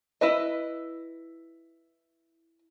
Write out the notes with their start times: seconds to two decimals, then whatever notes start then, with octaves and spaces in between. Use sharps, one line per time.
0.21 E4 B4 D#5